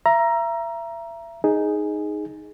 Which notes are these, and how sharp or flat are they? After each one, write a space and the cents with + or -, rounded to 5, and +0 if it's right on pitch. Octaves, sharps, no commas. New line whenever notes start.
E5 +35 A#5 +10
D#4 +0 G#4 +0